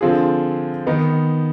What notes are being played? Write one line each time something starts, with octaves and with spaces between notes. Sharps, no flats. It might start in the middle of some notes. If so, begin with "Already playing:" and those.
D3 F3 C4 F4 G#4
D#3 B3 D#4